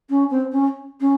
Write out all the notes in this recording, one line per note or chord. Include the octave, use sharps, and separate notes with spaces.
C#4
C4
C#4
C#4